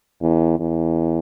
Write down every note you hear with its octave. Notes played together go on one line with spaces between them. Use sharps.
E2
E2